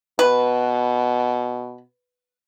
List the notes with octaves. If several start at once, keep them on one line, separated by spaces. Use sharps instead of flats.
B2 B4